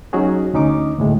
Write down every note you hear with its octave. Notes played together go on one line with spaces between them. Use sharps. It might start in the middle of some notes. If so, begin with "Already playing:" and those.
F#3 C#4 D#4 F#4 G#4
D2 C#4 D#4 D6
D2 A2 G#3